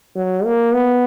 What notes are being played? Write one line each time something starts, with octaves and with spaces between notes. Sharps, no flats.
F#3
A#3
B3